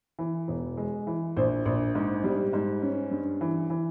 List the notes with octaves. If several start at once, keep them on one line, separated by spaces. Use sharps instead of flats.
E3
E1
G#3
E3
A#1 C5
A#1
G#2
G3
G#2
C#4
G2
E3
E3